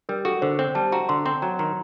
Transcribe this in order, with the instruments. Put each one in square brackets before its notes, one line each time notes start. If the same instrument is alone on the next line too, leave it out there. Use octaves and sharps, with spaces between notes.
[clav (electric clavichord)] G3 [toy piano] A#4
[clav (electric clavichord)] F#4 [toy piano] A4
[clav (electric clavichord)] D3 [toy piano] C5
[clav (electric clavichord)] C4 [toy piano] C5
[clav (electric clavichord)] G3 [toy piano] A5
[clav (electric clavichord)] F#4 [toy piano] A#5
[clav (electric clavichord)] D3 [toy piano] C6
[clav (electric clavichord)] C4 [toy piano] C6
[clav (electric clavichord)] F#3 [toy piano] A#5
[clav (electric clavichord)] D#3 [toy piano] A#5